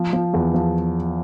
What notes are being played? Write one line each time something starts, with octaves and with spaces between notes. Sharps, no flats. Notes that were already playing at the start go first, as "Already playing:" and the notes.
Already playing: F3
F3
E2
F3